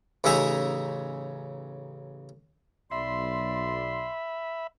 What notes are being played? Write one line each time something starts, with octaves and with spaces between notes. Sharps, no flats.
A1 C#3 D#4 E5 G#5 A#5
B1 D5 E5 B5 C6